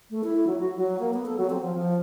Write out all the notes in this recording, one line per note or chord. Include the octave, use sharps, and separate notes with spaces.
A3
E4
F#3
F#4
F#3
A#3
B3
A4
F#3
C4
F3
F3